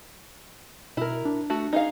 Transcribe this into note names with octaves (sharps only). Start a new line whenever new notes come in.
B2 E4 A#4
D4
A3 F#4
D#4 G#4 F5